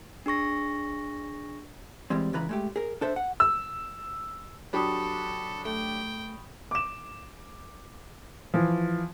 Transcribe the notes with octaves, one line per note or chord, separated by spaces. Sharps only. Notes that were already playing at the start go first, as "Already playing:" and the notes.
D4 G#4 C#6 A#6
E3 G3 G#3 C4
C#2 C#3 E3 B4 A#5 B5
G#3 A3 G4
G#4 A#4
D4 A4 C5 E5
F#5
E6
F#3 D4 G4 A4 B5 C#6 D#6
A3 G5
D6 E7
E3 F3